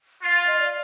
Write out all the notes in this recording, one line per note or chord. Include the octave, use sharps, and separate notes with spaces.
F4
F5
D#5
D5